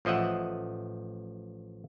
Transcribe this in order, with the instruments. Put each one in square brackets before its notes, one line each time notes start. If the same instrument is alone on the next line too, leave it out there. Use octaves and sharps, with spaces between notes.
[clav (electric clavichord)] A1 F3 D#5 E5 F#5